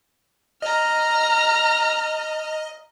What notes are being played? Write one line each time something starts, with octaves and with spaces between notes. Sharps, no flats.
D#5 A#5 F6